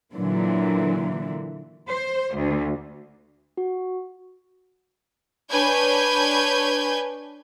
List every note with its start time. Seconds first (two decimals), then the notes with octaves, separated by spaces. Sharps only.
0.14 A#2 D3 E3 F#3
1.89 C5
2.34 D2
3.57 F#4
5.50 D4 B4 C#5 G#5 G6 G#6